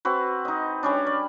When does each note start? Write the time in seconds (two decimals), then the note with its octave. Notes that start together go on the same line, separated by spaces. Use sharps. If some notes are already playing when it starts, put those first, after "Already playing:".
0.05 C4 F#4 B4
0.45 D#4 D#5
0.83 G3 C#4 D4
1.07 D5